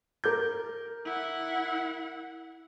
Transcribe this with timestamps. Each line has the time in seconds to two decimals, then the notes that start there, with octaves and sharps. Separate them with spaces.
0.24 A#4 D6 G6
1.05 E4 F#5